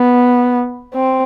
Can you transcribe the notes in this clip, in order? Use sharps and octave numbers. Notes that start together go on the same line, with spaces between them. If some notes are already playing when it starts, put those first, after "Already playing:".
Already playing: B3
C4